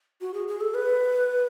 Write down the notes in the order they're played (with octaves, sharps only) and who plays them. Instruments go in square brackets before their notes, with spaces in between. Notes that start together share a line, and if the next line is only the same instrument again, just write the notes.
[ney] F#4
G#4
G#4
A4
B4